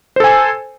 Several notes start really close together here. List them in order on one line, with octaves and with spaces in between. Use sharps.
C5 A4 G#5